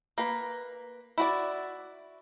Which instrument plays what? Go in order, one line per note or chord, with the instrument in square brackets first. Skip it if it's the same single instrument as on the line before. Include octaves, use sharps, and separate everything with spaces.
[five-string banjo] A#3 B4
E4 F#4 D5